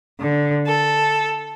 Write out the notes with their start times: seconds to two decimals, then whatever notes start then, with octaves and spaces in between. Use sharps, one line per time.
0.20 D3
0.67 A4